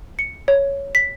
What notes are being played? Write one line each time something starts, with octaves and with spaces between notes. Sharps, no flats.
C#7
C#5
B6